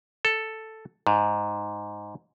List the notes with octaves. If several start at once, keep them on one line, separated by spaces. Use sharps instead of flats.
A4
G#2